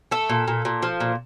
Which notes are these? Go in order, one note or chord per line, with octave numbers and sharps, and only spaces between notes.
A3 A4
A#2
A#2
A#2
F3
A#2